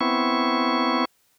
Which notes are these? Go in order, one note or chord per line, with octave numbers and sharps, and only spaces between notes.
B3 C4 E4 C#6